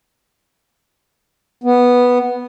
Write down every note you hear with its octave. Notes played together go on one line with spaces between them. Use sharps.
B3